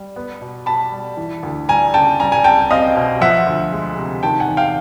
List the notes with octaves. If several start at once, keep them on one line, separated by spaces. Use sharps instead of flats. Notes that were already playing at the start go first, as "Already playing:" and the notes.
Already playing: G3
B3
B2
B2 A5 B5
G3
E3
D2
G3 G#5 A#5
C#3 G5 A5
G3 G#5 A#5
G#5 A#5
C2 G5 A5
C4 D#5 F5
B2
F3 E5 F#5
D2
G#3
C3
D#3 G5 A5
F#5 G#5
E2
F5 G5